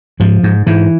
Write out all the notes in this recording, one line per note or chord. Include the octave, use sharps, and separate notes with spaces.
G#2 F3
G#2
G#2 E3